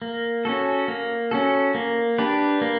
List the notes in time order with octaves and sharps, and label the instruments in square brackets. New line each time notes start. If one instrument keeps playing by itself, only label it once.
[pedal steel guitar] A#3
C#4 F#4 A4
A#3
C#4 F#4 A4
A#3
D4 G4 B4
A#3